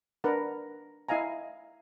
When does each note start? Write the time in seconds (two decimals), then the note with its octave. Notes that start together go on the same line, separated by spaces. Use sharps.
0.24 D4 A#4 B4 F#5
1.09 E4 D#5 F5 G#5 A#5